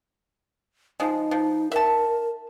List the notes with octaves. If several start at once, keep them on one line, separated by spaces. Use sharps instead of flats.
F3 G#3 D#4
F3
A#4 E5 A5